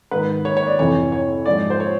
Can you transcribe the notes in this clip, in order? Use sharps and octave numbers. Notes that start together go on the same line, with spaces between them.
G#2 D#3 B4
C#5
C#5
D5
F2 C3 E3 C#5
C#5
G#2 F3 D5
C5
C#5